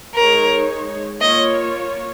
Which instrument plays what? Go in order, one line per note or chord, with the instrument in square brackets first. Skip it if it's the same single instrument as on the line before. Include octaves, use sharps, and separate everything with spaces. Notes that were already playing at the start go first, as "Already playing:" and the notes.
[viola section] G#3 D#4 C#5 [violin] A#4
[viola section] A#3 F4 C#5 [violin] D#5